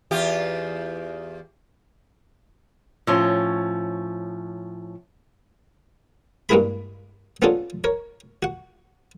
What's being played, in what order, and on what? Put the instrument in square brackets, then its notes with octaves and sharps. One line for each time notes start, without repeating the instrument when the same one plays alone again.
[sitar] E2 F4 G4
[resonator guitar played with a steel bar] A2 F3 C#4
[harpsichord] G2 G#3 A#3 E4 G#4 B5
B3 C#4 D4 F4 G#4 A4
A#4 C#5
F#4 F#5